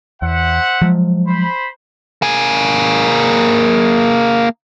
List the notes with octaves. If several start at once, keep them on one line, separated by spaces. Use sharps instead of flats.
E2 C5 E5 F#5
F3 F#3 G#3
C5 B5
A#3 G#4